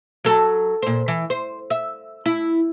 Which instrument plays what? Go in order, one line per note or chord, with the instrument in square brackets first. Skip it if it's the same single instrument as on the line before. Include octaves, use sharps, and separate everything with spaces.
[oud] F#3 A4
A#2 C5
E3
C5
E5
E4